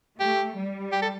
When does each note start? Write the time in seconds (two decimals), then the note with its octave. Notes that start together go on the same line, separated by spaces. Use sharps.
0.19 A3 G4
0.56 G3
0.92 G4
1.02 A4